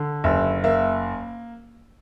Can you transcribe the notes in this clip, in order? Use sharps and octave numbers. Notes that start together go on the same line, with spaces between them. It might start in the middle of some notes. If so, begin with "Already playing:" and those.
Already playing: D3
F#1 E5
A#3 E5